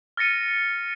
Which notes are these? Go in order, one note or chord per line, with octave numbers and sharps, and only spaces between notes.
F6 A6 A#6 C#7 D#7